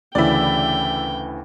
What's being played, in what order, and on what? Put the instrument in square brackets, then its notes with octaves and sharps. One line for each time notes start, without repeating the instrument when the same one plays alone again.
[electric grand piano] D2 C#3 E3 [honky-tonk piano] E4 D5 [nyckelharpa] G5